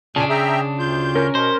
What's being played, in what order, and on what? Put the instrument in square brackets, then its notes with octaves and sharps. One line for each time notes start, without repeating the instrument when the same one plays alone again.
[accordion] F2 G#5 [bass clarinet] A#2 [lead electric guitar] C#3 D4 [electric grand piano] A5
[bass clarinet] G#4 [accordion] E5 G5 A#5
[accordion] D2 G6 [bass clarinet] F4
[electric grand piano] C#4 A#4
[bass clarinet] B2 [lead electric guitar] C5